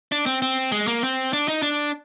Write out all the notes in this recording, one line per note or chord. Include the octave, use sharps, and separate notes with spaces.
D4
C4
C4
G#3
A#3
C4
D4
D#4
D4